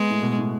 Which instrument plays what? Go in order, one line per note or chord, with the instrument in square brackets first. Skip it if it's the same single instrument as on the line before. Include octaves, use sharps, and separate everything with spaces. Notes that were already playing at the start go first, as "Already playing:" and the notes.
Already playing: [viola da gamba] G#3 [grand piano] B3
[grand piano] A2
B2
A2